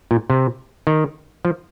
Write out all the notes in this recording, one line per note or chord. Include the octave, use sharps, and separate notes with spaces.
A#2
C3
D#3
F3